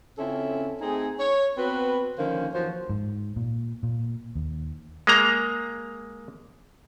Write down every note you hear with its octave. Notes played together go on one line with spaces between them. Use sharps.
C#3 C4 C#4 E4 F4 A4
A3 C4 D#4 G#4
C#5
B3 C4 F#4 B4
D3 D#3 F3 A#3 C#4 C5
F#2 E3 F3 A#3 F#4 C5
G#2
A#2
A#2
D#2
G#3 A#3 A#5